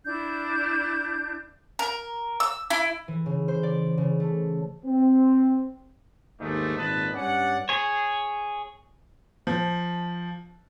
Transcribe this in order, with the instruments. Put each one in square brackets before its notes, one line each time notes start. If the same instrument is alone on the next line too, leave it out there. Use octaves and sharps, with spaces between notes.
[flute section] D4 E4 G6
[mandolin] A#4
E6
E4
[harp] E3
C#3
C5
D5
C#3
A3
[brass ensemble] C4
D#2 G#2 A3 D4 D#4
G#1 A#2 B4 D#5 A5
G2 C#4 D5 F#5
[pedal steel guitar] G#4 C#5
[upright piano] F3